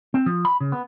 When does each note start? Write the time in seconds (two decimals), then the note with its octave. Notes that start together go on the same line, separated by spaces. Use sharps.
0.14 C4
0.26 F3
0.45 B5
0.61 C#3
0.72 B3